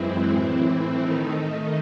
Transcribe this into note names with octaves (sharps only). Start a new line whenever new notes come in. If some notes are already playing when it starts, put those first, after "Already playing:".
Already playing: F#2 E3 G#3 C4 E4
A2 E3 C4 E4
D#3 A3 D#4